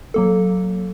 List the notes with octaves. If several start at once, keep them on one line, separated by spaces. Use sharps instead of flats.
F#3 A#3 A4